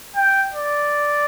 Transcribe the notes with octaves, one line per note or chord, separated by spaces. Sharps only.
G5
D5